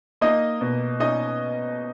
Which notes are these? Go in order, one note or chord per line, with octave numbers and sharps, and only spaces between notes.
A#3 D#4 D#5
B2
C#4 D#4 D#5